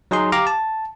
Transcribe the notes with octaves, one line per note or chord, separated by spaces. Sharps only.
F#3 D#4 G#4 C6
G4 F5 A#5 D6
A5